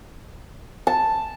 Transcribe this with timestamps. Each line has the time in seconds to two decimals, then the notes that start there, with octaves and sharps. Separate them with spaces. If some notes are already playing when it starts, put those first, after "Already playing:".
0.87 A5